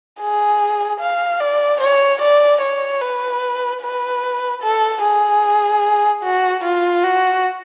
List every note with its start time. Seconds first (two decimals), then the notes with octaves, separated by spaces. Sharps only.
0.20 G#4
1.00 F5
1.40 D5
1.81 C#5
2.22 D5
2.62 C#5
3.01 B4
3.82 B4
4.62 A4
5.03 G#4
6.23 F#4
6.64 F4
7.04 F#4